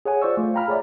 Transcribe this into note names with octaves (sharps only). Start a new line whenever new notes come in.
G#4 C#5 F#5 G#5
F4 C5 D5 C#6 E6
A3 F4
F5 G5 A#5 B5 F6
G#4 C#5 D5 E5